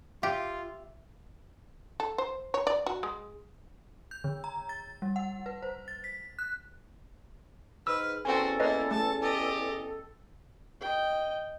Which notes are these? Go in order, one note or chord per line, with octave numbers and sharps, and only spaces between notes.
F4 G4 E5
A4
C5
C#5
D5
F#4
G#3
G6
D3
A#5
A6
G3
F#5
B4
C5
A6
B6
F#6
G#2 B4 E6 F6
E2 C4 C#4 F#4 A4 G5 G#5
A#3 E4 B4 C#5 D#5
A3 A5
G4 D#5
D#5 G5